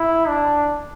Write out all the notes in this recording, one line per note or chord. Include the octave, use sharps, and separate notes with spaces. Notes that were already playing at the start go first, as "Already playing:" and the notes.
Already playing: E4
D4